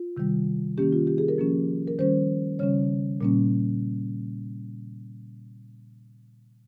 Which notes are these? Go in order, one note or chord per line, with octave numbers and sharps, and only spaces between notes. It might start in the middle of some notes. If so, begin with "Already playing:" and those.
Already playing: F4
C3 D#3 G3
D#3 A#3 C#4 G4
F4
G4
G#4
A#4
F3 A#3 C#4
A#4
D#3 G3 C#4 C5
C#3 G3 C#4 C#5
A#2 G3 A#3 C#4